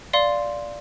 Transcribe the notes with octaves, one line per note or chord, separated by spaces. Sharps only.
D5 F5 C6